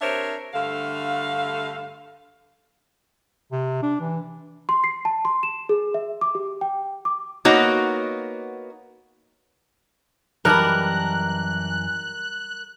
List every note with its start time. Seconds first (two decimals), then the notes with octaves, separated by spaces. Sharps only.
0.01 C3 D4 A#4 C5 C#5 E5
0.53 G2 D3 A3 F5
3.52 C3
3.83 D4
4.00 E3
4.69 C6
4.84 C7
5.05 A5
5.25 C6
5.43 E7
5.69 G#4
5.94 E5
6.21 D6
6.35 G4
6.61 G5
7.05 D6
7.45 A#3 B3 D#4 F#4 C#5
10.45 F#2 E3 G3 D#4 A#4 B4 A5 F#6